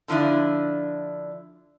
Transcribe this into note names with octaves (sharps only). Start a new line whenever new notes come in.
D3 F3 D4 E4